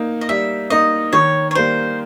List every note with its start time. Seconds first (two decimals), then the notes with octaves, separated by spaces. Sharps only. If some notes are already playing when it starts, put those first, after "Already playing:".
Already playing: A#3 D#4
0.21 D#5
0.29 G3 E5
0.70 A#3 D#4 D#5
1.13 D#3 C#5
1.51 C#5
1.55 G3 A#3 C5